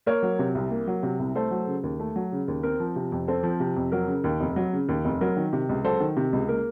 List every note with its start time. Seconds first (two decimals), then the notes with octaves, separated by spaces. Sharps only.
0.06 A#3 A#4 C#5
0.23 F#3
0.39 C3
0.55 C2
0.71 A#3
0.87 F#3
1.03 C3
1.19 C2
1.35 A3 A4 C5
1.51 F#3
1.67 C#3
1.83 D#2
1.99 A3
2.16 F#3
2.32 C#3
2.48 D#2
2.63 C4 A#4
2.80 F3
2.96 C3
3.12 F2
3.28 C4 A4 C5
3.43 F3
3.60 C3
3.76 F2
3.92 F#3 A#4
4.08 C#3
4.24 D#2
4.40 F1
4.56 F#3
4.73 C#3
4.88 D#2
5.05 F1
5.21 F#3 A#4
5.36 D#3
5.53 C3
5.69 C#2
5.84 F#3 A4 C5
6.00 D#3
6.17 C3
6.33 C#2
6.49 A#3 A#4